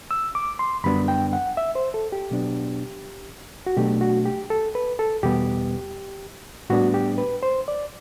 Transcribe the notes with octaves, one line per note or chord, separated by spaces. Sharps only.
E6
D6
C6
F#2 D3 G3 B3 D4 B5
G5
F#5
E5
C5
A4
G4
B2 F#3 B3 D4
F#4
B2 F#3 A3 D4 G4
F#4
G4
A4
B4
A4
E2 B2 G3 B3 G4
A2 G3 B3 D4 F#4
G4
B4
C5
D5